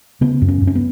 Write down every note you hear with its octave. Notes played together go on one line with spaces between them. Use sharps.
C#3 B3
F#2
C#4
F#2
C#4
B3